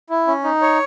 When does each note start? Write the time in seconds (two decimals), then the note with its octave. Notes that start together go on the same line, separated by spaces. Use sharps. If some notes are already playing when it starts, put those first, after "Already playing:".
0.10 E4
0.27 C#4
0.44 D#4
0.62 C#5